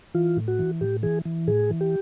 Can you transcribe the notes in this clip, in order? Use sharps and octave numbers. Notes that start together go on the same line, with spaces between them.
E3 F4
A2
F#4
E3
A2 G4
E3 G#4
E3
A2 G#4
E3
G4